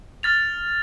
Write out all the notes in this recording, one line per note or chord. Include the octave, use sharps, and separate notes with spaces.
F6 A6 F7